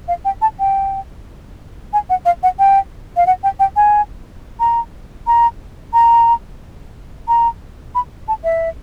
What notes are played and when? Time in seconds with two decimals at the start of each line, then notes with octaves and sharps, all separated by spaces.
0.08 F5
0.25 G5
0.42 A5
0.59 G5
1.93 G#5
2.10 F#5
2.25 F5
2.43 F#5
2.59 G5
3.17 F5
3.26 F#5
3.43 G5
3.59 G5
3.76 G#5
4.60 A#5
5.27 A#5
5.93 A#5
7.28 A#5
7.95 B5
8.28 A5
8.44 E5